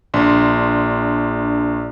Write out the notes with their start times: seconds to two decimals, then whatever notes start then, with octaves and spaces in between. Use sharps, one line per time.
0.14 A#1 D4 C6